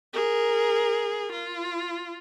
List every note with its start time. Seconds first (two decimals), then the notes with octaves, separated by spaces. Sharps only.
0.13 G#4 A#4
1.32 F4